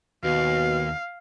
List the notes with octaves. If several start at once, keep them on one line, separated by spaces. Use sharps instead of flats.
D#2 B2 F5